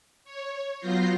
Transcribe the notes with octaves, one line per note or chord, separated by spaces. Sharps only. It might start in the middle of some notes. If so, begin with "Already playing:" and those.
C#5
F#3 B3 F4 G6 A#6 C7